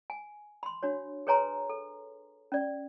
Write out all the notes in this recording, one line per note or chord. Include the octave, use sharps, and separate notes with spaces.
G#5
B5 C6
D4 F#4 C#5
G#4 B4 C#5 G#5 A#5 C6
A4
C#4 D5